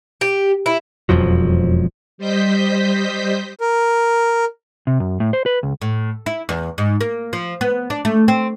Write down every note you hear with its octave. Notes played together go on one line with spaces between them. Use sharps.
G4
E4
E1 F2 F3 F#3
G3 C5 D#5 G6 B6
A#4
C3
F#2
A2
C5
B4
C#2
A2
E4
E2
G#2
A#3
F3
B3
D4
A3
C4